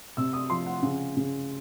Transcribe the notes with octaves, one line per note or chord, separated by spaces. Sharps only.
C3 E6
D#6
F3 C6
F#5
C#3
C#3